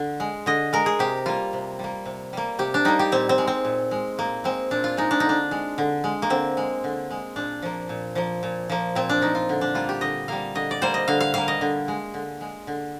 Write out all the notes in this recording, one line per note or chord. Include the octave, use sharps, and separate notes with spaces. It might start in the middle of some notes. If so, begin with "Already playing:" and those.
Already playing: D3
G#3
D3 D#5
G#3 A#4
G#4
C3 G4
G3 A#3 F4
C3
G3 A#3
C3
G3 A#3
C3 G4
D4
G3 A#3 D#4
G4
A#2 C4
C4
G#3
C4
A#2
G#3
A#2 A#3
G#3 C4
A#2 D4
F4
G#3 D#4
D4
D3 D#4
D4
G#3
D3
G#3
A#3
D3 C4
G#3
D3
G#3
A#2 D4
F3 A#3
A#2
F3 A#3
A#2
F3 A#3
A#2 C4
D4
F3 A#3 D#4
F4
D3
D4
G3 A#3 F4
G4
D3 D#5
G3 A#3 F5
D3 D#5
D5
G3 A#3 C5
D#5
D3 F5
F5
G3 A#3 F5
D#5
D3
G#3
D3
G#3
D3